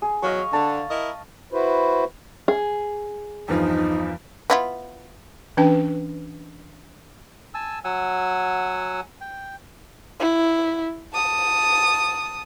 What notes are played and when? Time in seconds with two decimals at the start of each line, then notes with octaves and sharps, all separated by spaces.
0.02 G#4
0.22 E2 F#3 D#5 F5 C#6
0.53 D3 A5
0.91 E4 A#4 D#5
1.53 E4 F#4 B4 C5
2.48 G#4
3.48 E2 G2 F3 D#4
4.50 B3 E4 F4
5.57 E3 C#4 D4 B4 G5
7.54 G#5 A5 E6
7.84 F#3 F#5 G#5 E6
9.21 G5
10.20 E4
11.13 A5 D#6